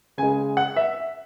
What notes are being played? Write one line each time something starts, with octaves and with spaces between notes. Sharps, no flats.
C#3 G#3 G#5
F#5
E5